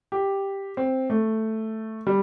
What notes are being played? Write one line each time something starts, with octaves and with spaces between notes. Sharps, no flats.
G4
C4
A3
G3